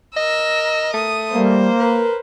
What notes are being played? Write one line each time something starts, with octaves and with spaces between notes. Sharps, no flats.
A#4 D#5 E6
A3 D#6
G3 A#3 C5
A#4 B4